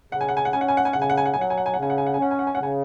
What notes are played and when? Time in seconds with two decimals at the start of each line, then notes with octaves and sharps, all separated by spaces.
0.12 C#3 F#5
0.21 G#5
0.29 F#5
0.37 G#5
0.45 F#5
0.53 C#4 G#5
0.61 F#5
0.68 G#5
0.77 F#5
0.85 G#5
0.93 C#3 F#5
1.02 G#5
1.10 F#5
1.17 G#5
1.26 F#5
1.34 F#3 G#5
1.41 F#5
1.50 G#5
1.57 F#5
1.66 G#5
1.74 F#5
1.77 C#3
1.83 G#5
1.90 F#5
1.98 G#5
2.06 F#5
2.14 G#5
2.18 C#4 F#5
2.31 G#5
2.39 F#5
2.47 G#5
2.55 F#5
2.59 C#3 G#5